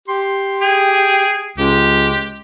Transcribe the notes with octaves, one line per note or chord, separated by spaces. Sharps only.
G4 C6
G#4 G5
C#2 G#3 G4